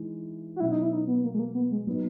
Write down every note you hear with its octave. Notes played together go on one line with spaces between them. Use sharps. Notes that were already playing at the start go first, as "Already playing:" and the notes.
Already playing: E3 G#3 D#4
F#4
B2 F#3 C#4 E4
D#4
E4
D#4
B3
A#3
G#3
A#3
B3
G#3
F#3 B3 D#4